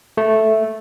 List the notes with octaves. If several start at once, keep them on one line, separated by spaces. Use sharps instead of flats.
A3